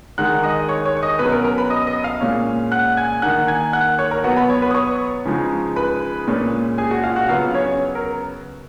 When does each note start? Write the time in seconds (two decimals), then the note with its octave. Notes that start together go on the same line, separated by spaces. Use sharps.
0.18 D#3 G#3 D#4 F#5 F#6
0.43 D#5 D#6
0.68 C#5 C#6
0.85 C#5 C#6
0.97 C#6
1.03 D#5 D#6
1.19 B2 F#3 C#4 B4 B5
1.32 A#4 A#5
1.44 A#4 A#5
1.58 B4 B5
1.70 D#5 D#6
1.87 D#5 D#6
2.04 F5 F6
2.21 A#2 G#3 C#4
2.72 F#5 F#6
2.97 G#5 G#6
3.22 D#3 A#3 D#4 F#5 F#6
3.48 G#5 G#6
3.73 F#5 F#6
3.99 C#5 C#6
4.11 A#4 A#5
4.24 B2 F#3 B3 F#4 F#5
4.37 B4 B5
4.49 C#5 C#6
4.62 B4 B5
4.71 D#6
4.75 C#5 C#6
5.25 C#3 F3 G#3 D#4
5.76 B4 B5
6.27 A#2 G#3 C#4
6.78 G#4 G#5
6.91 F#4 F#5
7.03 F4 F5
7.16 F#4 F#5
7.28 C#3 F#3 B3 F4 F5
7.54 C#4 C#5
7.95 A#4